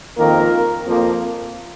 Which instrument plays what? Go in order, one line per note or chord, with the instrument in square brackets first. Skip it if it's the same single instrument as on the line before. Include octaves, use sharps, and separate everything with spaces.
[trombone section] F2 D#3 A#3 F4 A#4
F2 F3 A#3